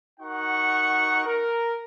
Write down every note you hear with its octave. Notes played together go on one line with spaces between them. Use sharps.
D#4 F#4 A#4 F#5 C#6
A#4